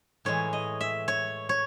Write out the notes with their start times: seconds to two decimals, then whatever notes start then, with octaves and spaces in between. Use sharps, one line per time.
0.25 A2 E3 G#3 C#5
0.53 D#5
0.81 E5
1.08 C#5
1.49 C#5